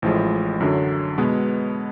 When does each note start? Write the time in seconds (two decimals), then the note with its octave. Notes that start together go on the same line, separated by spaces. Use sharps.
0.02 A1 A2 F3 G#3
0.60 F#2 D3 F#3
1.18 B2 G#3 B3